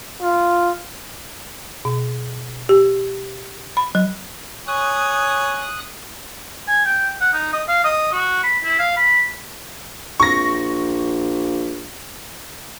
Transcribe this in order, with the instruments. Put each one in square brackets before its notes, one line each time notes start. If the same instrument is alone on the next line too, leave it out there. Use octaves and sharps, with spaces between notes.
[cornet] F4
[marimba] B2
G4
B5
F#3
[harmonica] C#5 G#5 [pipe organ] D#6 F#6
[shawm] G#5
G5
F#5
D#4
D#5
F5
D#5
F#4
B5
E4
F5
B5
[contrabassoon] A#1 [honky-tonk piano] C#6 A#6